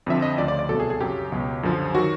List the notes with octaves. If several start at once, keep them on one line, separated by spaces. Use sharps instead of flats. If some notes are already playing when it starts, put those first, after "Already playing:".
F2 D3 F3 E5
D#5
D2 C#3 F3 D5
D5
D5
C2 B2 F#3 A4
G#4
G#4
F#2 C#3 F#3 G4
C#2 B2 F#3
F#2 D3 F3
D#3 F#3 F#4